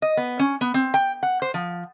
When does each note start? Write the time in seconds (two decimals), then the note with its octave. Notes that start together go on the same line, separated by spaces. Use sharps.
0.02 D#5
0.17 B3
0.39 C#4
0.61 B3
0.74 C4
0.94 G5
1.23 F#5
1.42 C5
1.54 F3